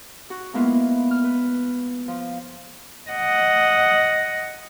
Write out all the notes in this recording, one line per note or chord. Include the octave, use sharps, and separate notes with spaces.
F#4
G#3 A#3 B3 E4 F4
F6
B4
F3
D#5 F#5